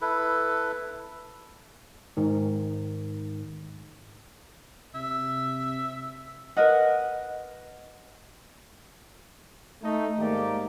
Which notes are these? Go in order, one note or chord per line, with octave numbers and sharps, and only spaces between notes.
E4 A4 B4
G#2 D#3
C3 E5
A#4 B4 D#5 F#5
A3 D#4
G#2 D#3 A#3 D#4 G4 D5